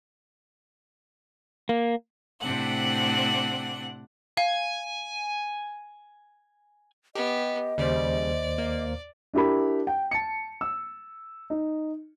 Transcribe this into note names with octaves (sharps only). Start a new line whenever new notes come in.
A#3
A2 C3 C4 D4 F#5
F5 G#5
B3 G4 D#5
D#2 C#3 G3 C5 D5
A#3
D4 E4 G4 A#4 B5
G5
A5 C#7
E6
D#4